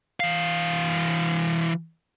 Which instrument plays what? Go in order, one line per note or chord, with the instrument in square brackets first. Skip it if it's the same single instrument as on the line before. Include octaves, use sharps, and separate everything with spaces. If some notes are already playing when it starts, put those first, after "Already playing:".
[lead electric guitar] E3 F5